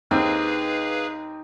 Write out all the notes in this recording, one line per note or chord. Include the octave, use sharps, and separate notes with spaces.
D#2 C4 D#4 G#4 B4 F5